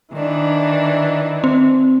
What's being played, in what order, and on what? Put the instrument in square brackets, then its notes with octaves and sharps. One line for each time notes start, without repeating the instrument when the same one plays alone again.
[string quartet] D#3 E3 D4
[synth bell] C4